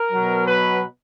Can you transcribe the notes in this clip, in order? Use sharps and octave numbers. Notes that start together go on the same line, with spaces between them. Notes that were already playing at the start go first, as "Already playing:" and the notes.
Already playing: A#4
B2 F#3
B4